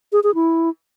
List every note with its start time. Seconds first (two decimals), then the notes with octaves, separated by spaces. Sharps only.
0.12 G#4
0.24 G#4
0.35 E4